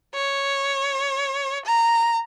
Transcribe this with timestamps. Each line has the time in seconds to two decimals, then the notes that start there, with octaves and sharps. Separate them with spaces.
0.15 C#5
1.66 A#5